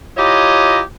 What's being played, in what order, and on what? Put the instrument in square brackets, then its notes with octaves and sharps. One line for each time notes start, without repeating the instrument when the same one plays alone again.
[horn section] E4 F4 G4 C#5 D#5 A#5